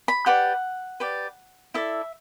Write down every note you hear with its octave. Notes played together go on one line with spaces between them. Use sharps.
B5
G4 B4 D5 F#5
G4 B4 D5
E4 A4 D5 E5